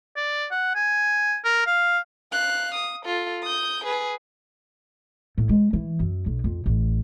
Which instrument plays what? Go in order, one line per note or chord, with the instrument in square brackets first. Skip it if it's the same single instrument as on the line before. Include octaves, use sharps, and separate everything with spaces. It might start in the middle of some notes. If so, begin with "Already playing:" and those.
[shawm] D5
F#5
G#5
A#4
F5
[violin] F5 F#6
D#6
F4 A4
D#6 G6
G#4 B4
[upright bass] A2
G#3
E3
F#2
B1
F2
A1